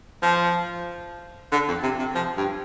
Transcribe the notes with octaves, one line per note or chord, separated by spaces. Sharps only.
F3
D3
F2
C3
C3
F3
G2